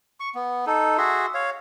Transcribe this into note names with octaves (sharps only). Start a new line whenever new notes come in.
C#6
B3
D#4 A4
F#4 G#4 E5 C6
C#5 F5